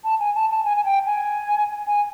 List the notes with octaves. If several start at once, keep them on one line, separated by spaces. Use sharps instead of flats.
A5
G#5
A5
A5
G#5
G#5
G5
G#5
G#5